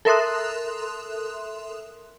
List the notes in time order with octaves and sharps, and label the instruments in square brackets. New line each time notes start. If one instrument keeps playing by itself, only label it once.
[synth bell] A4 A#4 E5 C6 D#6 F#6